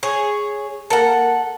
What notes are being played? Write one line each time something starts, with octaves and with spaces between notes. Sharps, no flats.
G#4 C#5
A#3 A4 A#4 F#5 A5